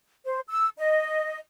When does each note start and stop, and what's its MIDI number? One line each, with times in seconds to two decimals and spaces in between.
0.25 0.39 72
0.48 0.68 88
0.78 1.38 75